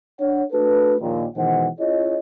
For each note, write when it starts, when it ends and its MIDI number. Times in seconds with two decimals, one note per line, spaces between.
0.20 0.43 62
0.20 0.43 73
0.20 0.43 78
0.52 0.96 57
0.52 0.96 62
0.52 0.96 66
0.52 0.96 69
0.52 0.96 71
1.01 1.26 34
1.01 1.26 39
1.01 1.26 46
1.37 1.68 47
1.37 1.68 51
1.37 1.68 52
1.37 1.68 56
1.37 1.68 72
1.37 1.68 78
1.80 2.18 61
1.80 2.18 64
1.80 2.18 65
1.80 2.18 68
1.80 2.18 73
1.80 2.18 75